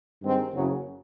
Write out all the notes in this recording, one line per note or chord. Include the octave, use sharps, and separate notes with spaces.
G2 D#3 G#3 C4
F#1 F#2 C#3 F#3